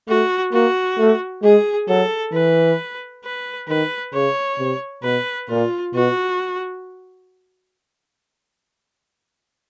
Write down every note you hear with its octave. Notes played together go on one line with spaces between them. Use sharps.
A3 F#4
A#3 F#4
A3
G#3 G#4
F#3 A4
E3 B4
B4
D#3 B4
C#3 C#5
C3
B2 B4
A#2 F4
B2 F#4